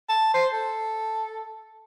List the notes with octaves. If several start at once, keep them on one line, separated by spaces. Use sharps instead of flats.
A5
C5
A4